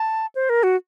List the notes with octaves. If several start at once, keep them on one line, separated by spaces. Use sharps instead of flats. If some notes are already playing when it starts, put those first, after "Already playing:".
Already playing: A5
C5
A#4
F#4